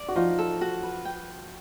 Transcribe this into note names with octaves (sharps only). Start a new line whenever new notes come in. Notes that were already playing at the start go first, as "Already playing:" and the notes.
Already playing: D5
F#4
F3 D#4 F4
A4
F#4
B4
G5